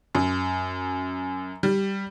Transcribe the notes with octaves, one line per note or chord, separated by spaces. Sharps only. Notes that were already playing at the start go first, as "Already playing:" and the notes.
F#2
G3